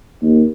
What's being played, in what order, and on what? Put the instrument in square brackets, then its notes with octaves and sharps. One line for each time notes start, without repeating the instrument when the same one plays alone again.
[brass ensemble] D#2